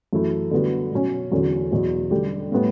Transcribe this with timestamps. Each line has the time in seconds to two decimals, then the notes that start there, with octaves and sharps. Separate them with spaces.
0.13 F#2 E3 A3 E4
0.51 D3 G3 B3 F#4
0.92 B2 F#3 C#4
1.31 E2 D3 F#3 C#4
1.71 E2 B2 F#3
2.11 D3 G3 D4 G4
2.52 A2 G3 B3